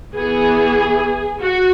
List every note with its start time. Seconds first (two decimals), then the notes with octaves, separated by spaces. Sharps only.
0.15 E3 B3 G#4
1.40 F#4